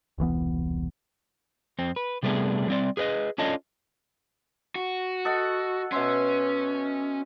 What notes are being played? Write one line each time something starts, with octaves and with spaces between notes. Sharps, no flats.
E1 C2 E3 B3
F2 C4
B4
C3 G3 A3 B3 D4 G#4
G3 C4 D5
G#4 B4 C#5 D#5
C#4 D4 F4 A4 C#5 D#5
F#4
A4 D#5 F#5
B2 C#4 E5 C6